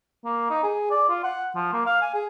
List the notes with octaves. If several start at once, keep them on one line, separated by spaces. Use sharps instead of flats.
A#3
D#4
G#4
D5
F4
F#5
F3
A#3
F5
G#5
G#4